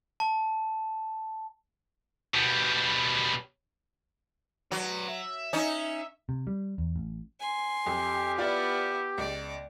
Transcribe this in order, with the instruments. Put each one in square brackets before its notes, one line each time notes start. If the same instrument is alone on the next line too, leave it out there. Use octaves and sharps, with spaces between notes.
[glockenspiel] A5
[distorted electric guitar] B2 G3
[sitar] F#3 [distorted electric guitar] B4 D5
[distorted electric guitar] E5
[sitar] C#4 D#4
[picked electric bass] C3
G3
E2
A1
[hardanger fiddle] G#5 C6
[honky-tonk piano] F2 [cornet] G4
[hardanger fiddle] B3 E4 [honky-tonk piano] F4 D5
[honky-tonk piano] C#2 [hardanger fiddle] D5